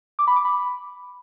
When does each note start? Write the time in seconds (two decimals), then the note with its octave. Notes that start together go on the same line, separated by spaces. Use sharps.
0.19 D6
0.27 B5
0.36 D6
0.45 B5